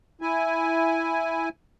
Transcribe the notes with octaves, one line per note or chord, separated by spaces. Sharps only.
E4 G#5